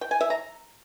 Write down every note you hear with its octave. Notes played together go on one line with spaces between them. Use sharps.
G5
G#5
E5
A#5